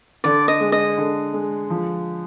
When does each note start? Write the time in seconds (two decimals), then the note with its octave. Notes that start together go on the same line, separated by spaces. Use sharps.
0.24 D3 D5
0.48 D#5
0.60 G#3
0.72 D#5
0.98 D3
1.33 G#3
1.70 F3